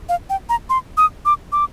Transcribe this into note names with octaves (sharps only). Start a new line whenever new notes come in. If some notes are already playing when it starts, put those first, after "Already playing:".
F5
G5
A#5
C6
D#6
D6
D6